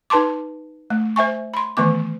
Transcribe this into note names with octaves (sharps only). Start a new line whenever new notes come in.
D#4 B4 A5 C6 D6
A3
C5 E5 G#5 C#6
B5 C6
D#3 E3 A3 B3 D6